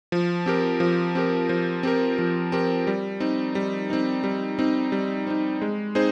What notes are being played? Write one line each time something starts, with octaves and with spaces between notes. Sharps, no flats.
F3
C4 G4 A#4
F3
C4 G4 A#4
F3
C4 G4 A#4
F3
C4 G4 A#4
G3
C4 D#4
G3
C4 D#4
G3
C4 D#4
G3
C4 D#4
G#3
C4 D#4 G#4 C5